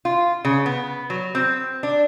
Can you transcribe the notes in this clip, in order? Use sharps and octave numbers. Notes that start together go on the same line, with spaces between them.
F4
C#3
B3
F#3
C4
D4